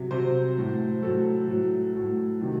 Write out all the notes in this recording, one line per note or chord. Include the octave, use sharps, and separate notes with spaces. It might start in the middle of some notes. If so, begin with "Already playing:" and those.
Already playing: C3 F#3
C3 F#3 C5
A2 F#3
A2 F#3 A4
A2 F#3
A2 F#3
C3 D#3 F#3